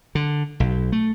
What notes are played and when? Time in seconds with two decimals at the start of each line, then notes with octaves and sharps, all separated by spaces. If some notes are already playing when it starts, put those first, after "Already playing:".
0.15 D3
0.60 B1
0.92 A3